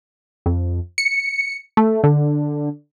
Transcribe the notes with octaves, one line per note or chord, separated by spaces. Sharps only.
F2
C#7
A3
D3